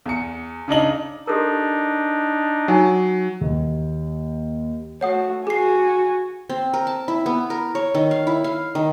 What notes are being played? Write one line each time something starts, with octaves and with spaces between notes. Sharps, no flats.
E2 C#7
C#3 D4 D#4 F#7
D4 D#4 G4 A4 A#4
F#3 D#4 C#5 G#5
D#2
A3 F#4 C#5 F#5 D#6
F#4 G#4 G#5 C7
C4
A#4
A5
E4
B3
A#4
C#5
D#3
F5
E4
F5
D#3